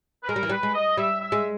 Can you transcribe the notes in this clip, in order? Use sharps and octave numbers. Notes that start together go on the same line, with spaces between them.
B4
G#3 A#4
G3
E3
G3 B4
G#3
D#5
G3 E5
E5
G#3